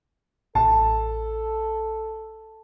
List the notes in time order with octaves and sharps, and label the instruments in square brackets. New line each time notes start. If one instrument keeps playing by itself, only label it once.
[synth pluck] A1 [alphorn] A4 [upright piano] A5